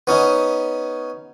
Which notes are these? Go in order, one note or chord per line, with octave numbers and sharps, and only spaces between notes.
B3 C#4 D#4